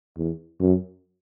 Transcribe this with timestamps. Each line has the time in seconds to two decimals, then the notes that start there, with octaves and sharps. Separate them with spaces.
0.17 E2
0.61 F#2